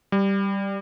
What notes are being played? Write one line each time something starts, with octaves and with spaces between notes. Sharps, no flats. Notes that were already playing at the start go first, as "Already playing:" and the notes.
G3